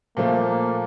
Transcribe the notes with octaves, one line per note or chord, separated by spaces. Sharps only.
A#2 F3 A3 A#3
A#3